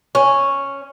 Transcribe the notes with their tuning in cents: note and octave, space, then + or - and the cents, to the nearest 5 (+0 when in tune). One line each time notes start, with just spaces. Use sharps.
C#4 -5